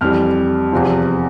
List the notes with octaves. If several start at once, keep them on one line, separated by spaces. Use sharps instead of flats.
F2 E3 G3 F6
E2 C3 F3